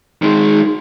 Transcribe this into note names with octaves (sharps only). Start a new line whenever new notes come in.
D#3 G#3